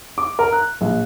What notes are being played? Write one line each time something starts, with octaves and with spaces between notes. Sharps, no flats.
D6
A#4
F#6
A#1